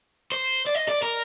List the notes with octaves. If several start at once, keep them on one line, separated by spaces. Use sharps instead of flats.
C5
D5
D#5
D5
A#4